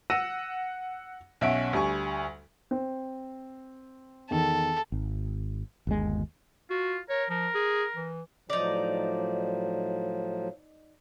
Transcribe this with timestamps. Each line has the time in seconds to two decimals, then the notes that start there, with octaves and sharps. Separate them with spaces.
0.10 F#5 E6 A#6 C#7 D#7 E7
1.41 B1 C#4 E5 F#5 D7
1.73 D2 G3 G#5 C#6
2.71 C4
4.31 E2 D#3 A4
4.92 G#1
5.87 G1 D#2 G#3
6.71 F4 F#4
7.10 A#4 C#5
7.30 F3 A#4
7.55 G#4
7.96 E3
8.50 A2 F3 F#3 D#4 D5